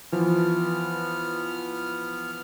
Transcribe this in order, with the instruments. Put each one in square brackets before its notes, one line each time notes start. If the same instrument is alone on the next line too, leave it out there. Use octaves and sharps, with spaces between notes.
[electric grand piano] E3 F3 [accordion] B3 F6